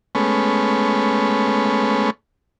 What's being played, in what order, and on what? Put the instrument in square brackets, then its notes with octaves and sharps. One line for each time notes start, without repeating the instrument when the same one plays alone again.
[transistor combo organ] G#3 A3 B3 C#4